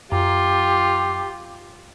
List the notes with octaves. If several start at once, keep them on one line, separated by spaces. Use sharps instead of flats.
F#2 F4 G4 A#5